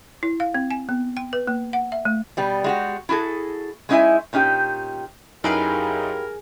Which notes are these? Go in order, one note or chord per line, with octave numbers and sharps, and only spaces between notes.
E4
F5
C4
G#5
B3
G5
B4
A#3
F#5
E5
A3
B2 G3 B3
G#3 F#4 G4
E4 F#4 G#4 A4
G#3 C#4 D#4 E4 E5 G#5
A#2 C#4 D#4 G4 G5
F#2 D#4 E4 G4 G#4 A#4 B4 F5